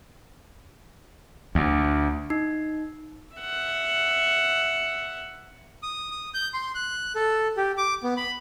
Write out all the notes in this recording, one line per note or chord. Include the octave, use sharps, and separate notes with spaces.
D2
D#4
E5 F#5
D#6
D#6
G6
C6
F#6
A4
G4
D6
B3
B5